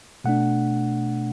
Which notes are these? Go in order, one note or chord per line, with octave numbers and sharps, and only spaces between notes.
B2 A3 D4 F#5